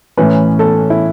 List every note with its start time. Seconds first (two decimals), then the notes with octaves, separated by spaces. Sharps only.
0.17 A2 E3 C#4 B4
0.59 A4
0.90 E4